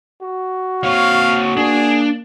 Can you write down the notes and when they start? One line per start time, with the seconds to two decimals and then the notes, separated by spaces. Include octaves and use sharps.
0.22 F#4
0.84 A#3 C4 C#5 F5
1.57 A#3 D4 G#4